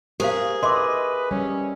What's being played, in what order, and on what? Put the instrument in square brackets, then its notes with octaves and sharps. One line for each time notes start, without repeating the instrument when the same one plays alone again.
[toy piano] G4 C5 F5 [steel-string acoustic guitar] G#4 [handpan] A#4
[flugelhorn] B4 [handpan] D#5 E5 [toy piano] C6 D6
[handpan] G3 [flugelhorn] C#4